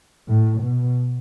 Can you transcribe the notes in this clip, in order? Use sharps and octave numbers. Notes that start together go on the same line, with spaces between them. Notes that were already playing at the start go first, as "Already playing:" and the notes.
A2
B2